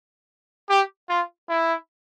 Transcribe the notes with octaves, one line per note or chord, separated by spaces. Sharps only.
G4
F4
E4